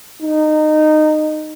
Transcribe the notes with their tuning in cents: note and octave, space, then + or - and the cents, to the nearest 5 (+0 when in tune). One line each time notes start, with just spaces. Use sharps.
D#4 -20